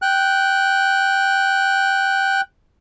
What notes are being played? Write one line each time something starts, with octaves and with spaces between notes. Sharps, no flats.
G5 F#6